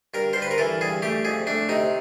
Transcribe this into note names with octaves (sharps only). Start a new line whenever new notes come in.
G2 A#4
G2 C5
B4
A#4
E3 A4
G2 G#4
A3 G4
F2 G#4
A3 D4
C3 D#4